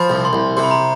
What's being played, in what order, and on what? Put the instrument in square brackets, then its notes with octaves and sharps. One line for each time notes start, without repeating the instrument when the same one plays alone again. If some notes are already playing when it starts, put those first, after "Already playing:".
Already playing: [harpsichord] F3 [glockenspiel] B5
[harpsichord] C2
[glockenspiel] C6
[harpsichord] C2
[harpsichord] C3 [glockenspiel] C6
[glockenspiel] B5
A#5
B5